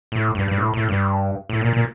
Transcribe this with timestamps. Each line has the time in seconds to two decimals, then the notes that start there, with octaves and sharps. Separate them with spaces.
0.12 A2
0.35 G2
0.48 G2
0.57 A2
0.74 A2
0.89 G2
1.49 A2
1.61 A#2
1.73 A#2